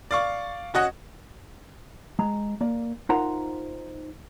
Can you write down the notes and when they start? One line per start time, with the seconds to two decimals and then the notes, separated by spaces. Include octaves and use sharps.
0.11 D5 F5 C#6
0.74 C#4 F#4 D#5 F#5
2.19 G#3 A#5
2.61 A#3 D5
3.09 D#4 F4 A#4 C5 F#5 A#5